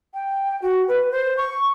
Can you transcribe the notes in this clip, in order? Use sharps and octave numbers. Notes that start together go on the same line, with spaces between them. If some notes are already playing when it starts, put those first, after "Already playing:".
G5
F#4
B4
C5
C#6